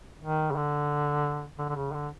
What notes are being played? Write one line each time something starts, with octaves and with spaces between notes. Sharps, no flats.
D#3
C#3
D3
D3
D3
C#3
D3